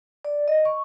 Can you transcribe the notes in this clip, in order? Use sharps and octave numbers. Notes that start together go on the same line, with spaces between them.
D5
D#5
C#6